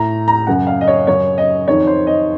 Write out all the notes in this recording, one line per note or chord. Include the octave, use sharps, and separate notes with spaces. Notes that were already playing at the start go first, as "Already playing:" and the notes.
Already playing: A2 A#5
A#5
F#2 C#3 F#5
F5
D#5
C#5
F#2 C#3 C#5
D#5
F2 D#3 C#5
C5
D#5